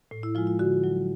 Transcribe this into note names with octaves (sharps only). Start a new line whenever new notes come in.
A2
E4
F3 G#3 F4
F4
D3 F#4
F#3